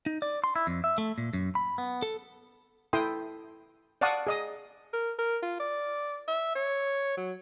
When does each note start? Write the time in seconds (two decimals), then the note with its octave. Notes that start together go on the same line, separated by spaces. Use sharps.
0.06 D#4
0.22 D5
0.44 C6
0.56 E4
0.67 F2
0.84 E5
0.98 A3
1.18 A#2
1.33 F#2
1.55 B5
1.78 B3
2.02 A4
2.93 E4 A4 G5 C6 D#6
4.01 D5 F5 F#5 A5 C#6 D#6
4.27 G#4 D#5 D#6
4.93 A#4
5.19 A#4
5.43 F4
5.60 D5
6.28 E5
6.56 C#5
7.17 F#3